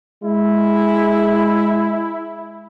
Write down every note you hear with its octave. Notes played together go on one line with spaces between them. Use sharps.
G#3 E4